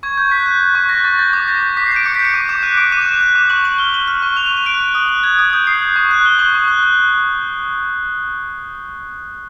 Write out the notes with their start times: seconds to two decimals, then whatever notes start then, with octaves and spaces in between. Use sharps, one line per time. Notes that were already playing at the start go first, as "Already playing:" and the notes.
0.03 C#6 G#6
0.18 C#6 G6
0.31 F#6 B6
0.46 F#6
0.61 F#6
0.75 C#6
0.89 F#6 A#6
1.04 C#6 A6
1.19 G6 A6
1.33 D6
1.47 G6 A#6
1.62 G6
1.77 D6 B6
1.86 C7
1.91 G6 D7
2.06 D6 C#7
2.15 G6 B6
2.25 C#7
2.34 D6 D#7
2.49 D6 E7
2.63 F#6 D#7
2.77 D6 D7
2.92 D6 D#7
3.01 F#6 E7
3.12 D#7
3.21 F#6
3.35 D6
3.50 C#6 F#7
3.64 C#6 F#7
3.78 F6 G7
3.93 F6 F#7
4.08 F6
4.22 C#6
4.37 F6 F7
4.46 D#7
4.51 C#6
4.57 D#7
4.65 F#6 D7
4.81 F#6
4.95 D#6
5.08 F#6
5.23 F#6 G#6
5.39 D#6
5.53 D#6 G6
5.67 D#6 C7
5.82 F#6
5.96 C#6
6.11 F#6
6.25 F#6 G7
6.39 C#6 F#7
6.54 C#6
6.68 F#6
6.83 F#6